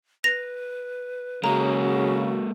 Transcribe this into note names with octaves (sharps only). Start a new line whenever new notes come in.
B4 A#6 F7
C#3 F#3 G#3 A#3 F#4 A#5